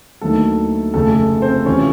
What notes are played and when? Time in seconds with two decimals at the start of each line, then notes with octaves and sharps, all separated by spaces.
0.21 D2 D3 F#3 A3 A#3 D#4 A4
0.94 F1 F2 C#3 A3 A4
1.42 C4 C5
1.66 E2 C3 F3 C#4 C#5